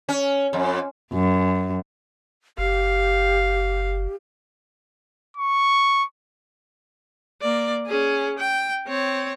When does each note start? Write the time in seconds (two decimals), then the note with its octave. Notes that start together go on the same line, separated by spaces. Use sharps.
0.09 C#4
0.53 F2
1.12 F#2
2.58 F#1 G4 F5
5.37 C#6
7.41 A#3 D5
7.87 C#4 G#4
8.39 G5
8.87 C4 C#5